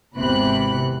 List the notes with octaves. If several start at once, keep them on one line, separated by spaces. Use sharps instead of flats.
G#1 E2 C3 B5 F#6